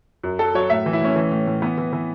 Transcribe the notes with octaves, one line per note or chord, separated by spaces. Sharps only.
F#2
F#3 A4
F#3 C#5
A2 E5
E3
E4
A2 C#4
E3
A2
A2
E3 B3
E3
E3